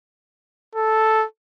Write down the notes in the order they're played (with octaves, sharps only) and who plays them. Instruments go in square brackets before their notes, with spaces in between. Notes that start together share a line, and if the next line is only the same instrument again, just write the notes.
[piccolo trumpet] A4